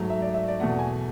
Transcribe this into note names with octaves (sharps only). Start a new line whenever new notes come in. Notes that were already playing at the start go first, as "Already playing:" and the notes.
Already playing: G#2 F#3 A3
E5
D5
E5
D5
E2 B2 A3 F#5
G#5